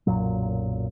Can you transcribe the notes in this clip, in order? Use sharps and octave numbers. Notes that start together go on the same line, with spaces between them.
B1 F#2 A#2 F#3